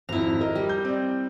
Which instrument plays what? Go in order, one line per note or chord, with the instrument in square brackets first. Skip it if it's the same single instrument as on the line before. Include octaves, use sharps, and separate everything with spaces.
[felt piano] G#1 F2 [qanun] E4 A#5
[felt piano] A#4 D#5
[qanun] G3
[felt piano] G6
C4 D5